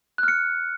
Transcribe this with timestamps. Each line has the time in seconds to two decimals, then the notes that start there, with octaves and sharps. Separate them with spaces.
0.18 F#6
0.23 F6
0.28 C#7